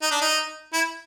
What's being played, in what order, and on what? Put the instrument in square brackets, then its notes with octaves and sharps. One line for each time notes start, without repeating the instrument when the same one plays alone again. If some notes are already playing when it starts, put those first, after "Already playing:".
[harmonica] D#4
D4
D#4
E4